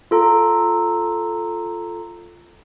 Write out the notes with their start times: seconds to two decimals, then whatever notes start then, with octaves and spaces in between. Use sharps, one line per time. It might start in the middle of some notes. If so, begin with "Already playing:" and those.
0.11 F4 A4 A#5